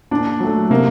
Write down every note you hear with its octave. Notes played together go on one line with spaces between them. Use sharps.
A#2 D4
F#3 A3
C3 A#3